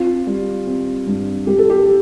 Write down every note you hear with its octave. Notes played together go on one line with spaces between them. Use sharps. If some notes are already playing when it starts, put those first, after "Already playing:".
Already playing: C4 F4
G3
C4
G2
G2 G4
A4
G4